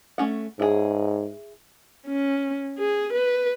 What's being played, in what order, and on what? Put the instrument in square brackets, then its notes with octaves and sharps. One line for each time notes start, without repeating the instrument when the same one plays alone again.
[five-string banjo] A3 C#4 F#5
[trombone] G#2 [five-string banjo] E4 G#4
[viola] C#4
G#4
B4